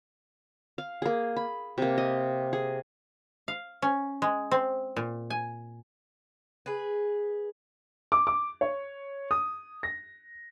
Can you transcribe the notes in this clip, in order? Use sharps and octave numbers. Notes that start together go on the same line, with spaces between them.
F5
A#3 G#4
B5
C3 A#3
D#5
G#4
F5
C#4
G#3
C4
A#2
G#5
G#4 B4
D6
D6
C#5
D#6
A#6